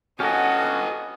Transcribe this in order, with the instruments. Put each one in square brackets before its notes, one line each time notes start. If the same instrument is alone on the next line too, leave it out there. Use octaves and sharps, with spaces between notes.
[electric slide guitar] C#4 F#4 [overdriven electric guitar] G4 A4 [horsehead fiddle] D#5 G#5 [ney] F#5